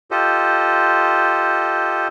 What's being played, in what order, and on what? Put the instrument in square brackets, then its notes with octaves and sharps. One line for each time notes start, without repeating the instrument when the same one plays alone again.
[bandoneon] F4 G4 A4 C5 D#5